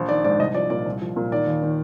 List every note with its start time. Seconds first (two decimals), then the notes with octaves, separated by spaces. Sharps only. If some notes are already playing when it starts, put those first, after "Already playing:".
Already playing: A#1
0.09 D#3 D5
0.24 G#2 D5
0.40 C2 D#5
0.55 F3 D5
0.70 A#2 D5
0.86 C2
1.01 F3
1.16 A#2
1.32 D#3 D5
1.47 D#2
1.62 D#3